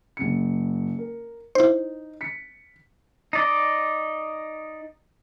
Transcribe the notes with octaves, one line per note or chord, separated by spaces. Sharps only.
F#1 C#3 C#7
A#4
D#4 E4 C5
B6 C#7
D#4 D5 D#5